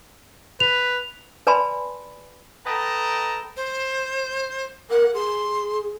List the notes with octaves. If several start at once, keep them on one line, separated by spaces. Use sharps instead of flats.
B4 F7
B4 D5 G#5 A5 B5 C6
A4 B4 D#5 G5 A5 A#5
C5
A#4 F#5
G#4 C6